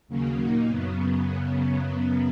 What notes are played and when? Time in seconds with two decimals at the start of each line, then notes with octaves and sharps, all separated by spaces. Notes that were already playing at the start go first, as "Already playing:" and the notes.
0.08 D#2 C#3 F#3 A#3 C#4
0.38 A#2 A#3 D#4 F#4
0.68 F#2 C#3 F#3 B3